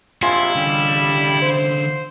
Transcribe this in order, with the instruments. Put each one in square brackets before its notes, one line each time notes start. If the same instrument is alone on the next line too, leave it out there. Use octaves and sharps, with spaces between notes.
[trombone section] A#1 C3 [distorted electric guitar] E4 [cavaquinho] F4 D#5 G#5
[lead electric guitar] D3 C#4 [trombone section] G3
[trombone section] C5